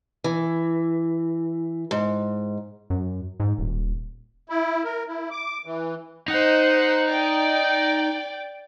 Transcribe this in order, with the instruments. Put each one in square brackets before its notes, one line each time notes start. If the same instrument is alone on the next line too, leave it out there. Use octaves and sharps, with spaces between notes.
[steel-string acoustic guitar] E3
G#2
[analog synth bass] F#2
G#2
D#1
[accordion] E4
A#4
E4
D6
E3
[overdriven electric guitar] D#4 [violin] C5 F#5
[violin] D5 G5